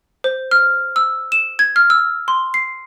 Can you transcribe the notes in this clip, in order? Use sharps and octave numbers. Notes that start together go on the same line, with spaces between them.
C5
F6
E6
E7
G#6
F6
E6
C6
C7